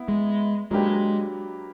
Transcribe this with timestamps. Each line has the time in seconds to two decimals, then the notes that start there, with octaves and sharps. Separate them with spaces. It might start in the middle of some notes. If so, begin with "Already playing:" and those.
Already playing: B3 E4
0.08 G#3
0.71 F#3 G#3 A#3 D4 G4 B4